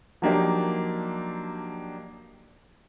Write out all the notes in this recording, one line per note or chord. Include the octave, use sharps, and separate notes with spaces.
F3 F#3 A#3 D4 D#4 G4